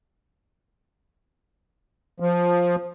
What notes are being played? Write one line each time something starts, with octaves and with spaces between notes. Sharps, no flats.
F3